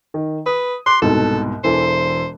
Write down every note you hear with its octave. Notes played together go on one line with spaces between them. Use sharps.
D#3
B4 D#6
C6 D6 F#6
C2 G#2 B2 A4
E1 E3 A4 C5